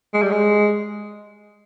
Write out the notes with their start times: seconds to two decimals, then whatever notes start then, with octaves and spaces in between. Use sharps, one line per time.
0.14 G#3
0.22 G3
0.31 G#3